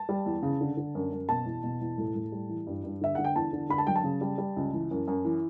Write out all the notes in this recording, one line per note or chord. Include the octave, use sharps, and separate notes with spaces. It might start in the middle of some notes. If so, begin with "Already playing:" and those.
Already playing: A5
G3
E2
C#3
D3
D3
F#2
F#2
B2 A5
E2
B2
E2
A2
A2
G3
E3
G2
G2
D3 E5
D3 F#5
G5
E2 A5
D3
D3 B5
A5
F#3 G5
A5
C#3
G3
G3
C#2
E3
F#2
F#2
E3